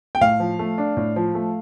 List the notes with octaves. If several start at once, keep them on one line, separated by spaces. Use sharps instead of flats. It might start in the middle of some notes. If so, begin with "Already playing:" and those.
G5
A2 F5
F3
A3
D4
A2
F3
A3